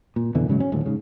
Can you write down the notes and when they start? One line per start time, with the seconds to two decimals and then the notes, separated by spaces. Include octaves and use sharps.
0.16 A#2
0.35 F2 B2 D3 E3
0.48 G#2 C#3 F#3 G#3
0.60 C#4
0.72 D#1 D2 A2
0.86 G#2 C#3